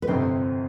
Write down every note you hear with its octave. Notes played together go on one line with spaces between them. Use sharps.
B4
G1 F2 C3 C4 C5